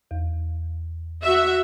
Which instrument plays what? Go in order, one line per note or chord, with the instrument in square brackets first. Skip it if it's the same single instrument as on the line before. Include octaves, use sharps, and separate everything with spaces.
[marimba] E2
[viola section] F#4 E5